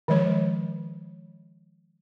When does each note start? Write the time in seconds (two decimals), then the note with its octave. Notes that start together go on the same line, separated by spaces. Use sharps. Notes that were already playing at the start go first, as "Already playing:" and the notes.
0.08 D#3 F3 G#3 C#5